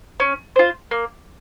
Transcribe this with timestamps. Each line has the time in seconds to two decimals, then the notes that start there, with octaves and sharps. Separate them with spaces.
0.20 C#4
0.56 F4 C5
0.91 A#3